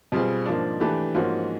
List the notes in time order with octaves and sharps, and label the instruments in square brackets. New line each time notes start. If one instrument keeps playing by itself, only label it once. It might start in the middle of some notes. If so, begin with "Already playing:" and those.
[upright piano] B2 G3 C4 F4 G#4
G#2 F3 A#3 D4
E3 A3 D4 G4 B4
G#2 F3 A#3 C#4 F#4